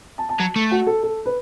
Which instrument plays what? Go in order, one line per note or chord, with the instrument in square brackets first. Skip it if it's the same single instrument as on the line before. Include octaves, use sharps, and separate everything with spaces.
[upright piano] A5
A5
[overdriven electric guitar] F#3
A3
[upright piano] F#4
A4
A4
B4